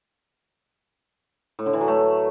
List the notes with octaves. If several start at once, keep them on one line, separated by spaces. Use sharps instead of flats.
A2
D3
E3
F#3
A3